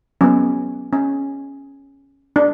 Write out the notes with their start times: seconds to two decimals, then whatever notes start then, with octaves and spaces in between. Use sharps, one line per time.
0.21 F#3 B3 C#4
0.93 C#4
2.36 D4